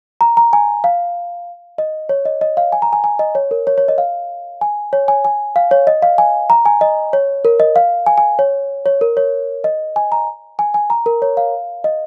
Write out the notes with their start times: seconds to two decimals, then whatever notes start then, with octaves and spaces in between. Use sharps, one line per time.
0.21 A#5
0.37 A#5
0.53 G#5
0.84 F5
1.78 D#5
2.09 C#5
2.25 D#5
2.41 D#5
2.57 F5
2.72 G#5
2.82 A#5
2.93 G#5
3.04 G#5
3.19 D#5
3.35 C#5
3.51 A#4
3.67 C#5
3.78 C#5
3.88 D#5
3.98 F5
4.61 G#5
4.93 C#5
5.08 G#5
5.25 G#5
5.56 F5
5.71 C#5
5.87 D#5
6.02 F5
6.18 G#5
6.50 A#5
6.66 G#5
6.81 D#5
7.13 C#5
7.45 A#4
7.60 D#5
7.76 F5
8.06 G#5
8.18 G#5
8.39 C#5
8.86 C#5
9.01 A#4
9.17 C#5
9.64 D#5
9.96 G#5
10.12 A#5
10.59 G#5
10.74 G#5
10.90 A#5
11.06 A#4
11.22 C#5
11.37 F5
11.84 D#5